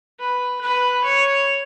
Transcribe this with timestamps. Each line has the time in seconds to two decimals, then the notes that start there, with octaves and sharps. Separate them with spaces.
0.20 B4
0.61 B4
1.04 C#5